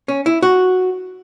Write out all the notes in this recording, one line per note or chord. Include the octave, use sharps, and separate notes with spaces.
C#4
E4
F#4